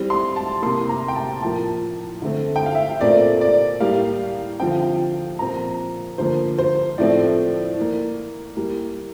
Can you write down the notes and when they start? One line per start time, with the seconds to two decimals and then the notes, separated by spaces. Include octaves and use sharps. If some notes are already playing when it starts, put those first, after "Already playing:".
Already playing: E3 G3 C4
0.10 C6
0.36 A5
0.62 C3 E3 A#3 C6
0.89 A#5
1.08 G5
1.16 A5
1.42 A2 F3 A#3 A5
2.22 D3 A3 C4
2.56 G5
2.66 F5
2.75 E5
3.01 A#2 A3 C4 D5
3.41 D5
3.80 A2 G3 A#3 F5
4.60 D3 F3 C4 G5
4.71 F5
4.81 G5
5.39 A#2 F3 C4 A#5
6.18 D3 F3 A#3 C5
6.58 C5
6.98 A2 F3 A3 C4 D5
7.77 E3 A#3
8.57 E3 G3 A#3